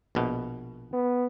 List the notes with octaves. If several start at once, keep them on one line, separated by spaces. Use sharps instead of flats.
A#1 B2
B3